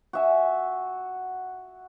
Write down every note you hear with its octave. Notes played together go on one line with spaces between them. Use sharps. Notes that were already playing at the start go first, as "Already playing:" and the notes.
F#4 E5 G#5